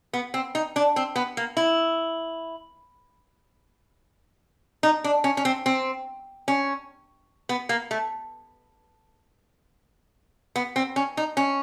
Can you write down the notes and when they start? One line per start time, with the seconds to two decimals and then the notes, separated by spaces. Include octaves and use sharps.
0.13 B3
0.34 C4
0.55 D#4
0.76 D4
0.96 C4
1.16 B3
1.37 A#3
1.57 E4
4.83 D#4
5.04 D4
5.24 C#4
5.37 C#4
5.45 C4
5.66 C4
6.48 C#4
7.49 B3
7.69 A#3
7.91 A3
10.56 B3
10.76 C4
10.96 C#4
11.17 D#4
11.37 C#4